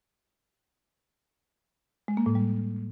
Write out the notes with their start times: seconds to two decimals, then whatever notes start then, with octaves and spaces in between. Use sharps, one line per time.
2.08 G#3
2.17 A#3
2.26 A2
2.35 G3